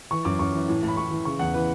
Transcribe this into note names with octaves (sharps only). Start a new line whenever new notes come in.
E3 C#6
F#2 D6
F#2 C#6
E3
A2
A2
B5
A2 C#6
E3
C#3 C#6
E2 F#5
E3 B4